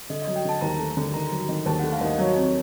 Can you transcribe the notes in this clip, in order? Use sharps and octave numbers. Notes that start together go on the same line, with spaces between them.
D3 D#5
D#5
F#3
G5
D3 A5
D#2 A#5
A3
D3
D#3 A#5
F#3
D#3
D#2 A5
F#5
A3
F5
D#2 D#5
F#3 C#5
F2